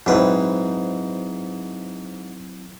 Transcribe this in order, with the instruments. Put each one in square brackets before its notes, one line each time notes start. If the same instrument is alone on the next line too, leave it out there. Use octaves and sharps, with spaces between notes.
[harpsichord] G#2 B4 [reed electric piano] F#3 C4 E4